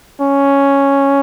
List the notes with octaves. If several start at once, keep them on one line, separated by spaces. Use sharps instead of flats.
C#4